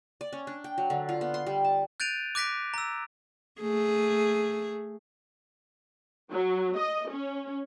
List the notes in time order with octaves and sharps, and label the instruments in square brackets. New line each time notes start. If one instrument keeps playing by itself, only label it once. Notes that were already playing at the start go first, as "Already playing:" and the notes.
[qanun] D5
C#4
D4
G5
F#3
D3
F4
B3
C6
G3
A5
[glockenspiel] F#6 G6 A6 D7 D#7 F7
D6 F#6 A#6 B6 D7
A#5 E6
[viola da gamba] A3 G#4
[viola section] F#3
D#5
C#4